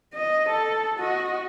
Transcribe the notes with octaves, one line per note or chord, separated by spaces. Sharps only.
D#5
A4
F#4 D#5